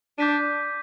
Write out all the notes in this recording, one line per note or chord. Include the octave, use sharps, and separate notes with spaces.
D4 D6 G6 B6 D#7